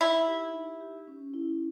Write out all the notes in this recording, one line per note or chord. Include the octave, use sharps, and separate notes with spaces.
D#4 E4
G4
D#4
G4
C#4
E4